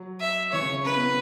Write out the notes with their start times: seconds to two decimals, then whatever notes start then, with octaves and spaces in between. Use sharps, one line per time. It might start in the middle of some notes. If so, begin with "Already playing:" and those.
Already playing: F#3
0.20 E5
0.52 E3 C#5
0.61 C#3
0.68 C#4
0.77 E4
0.85 C#4 B4
0.95 B3
1.06 B3